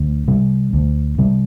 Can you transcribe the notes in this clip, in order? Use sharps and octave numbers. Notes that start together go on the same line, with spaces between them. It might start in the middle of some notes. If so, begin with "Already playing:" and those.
Already playing: D2
C3 G3
D2
C3 G3